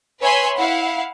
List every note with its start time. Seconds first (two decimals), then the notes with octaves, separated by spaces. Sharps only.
0.20 B4 C#5 E5 G#5 B5 C6
0.57 E4 F5 F#5